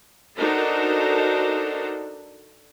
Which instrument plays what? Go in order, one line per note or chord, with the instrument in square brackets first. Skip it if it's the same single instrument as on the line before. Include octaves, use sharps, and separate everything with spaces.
[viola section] D4 D#4 F#4 A4 A#4 C5